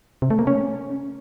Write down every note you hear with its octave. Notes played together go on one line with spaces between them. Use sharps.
C3
A3
A#3
C#4